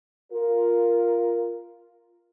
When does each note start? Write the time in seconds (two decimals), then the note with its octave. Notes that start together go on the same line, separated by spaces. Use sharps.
0.32 F4 A#4